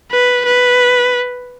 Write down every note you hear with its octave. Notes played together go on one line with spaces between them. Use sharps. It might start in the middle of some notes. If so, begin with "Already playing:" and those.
B4
B4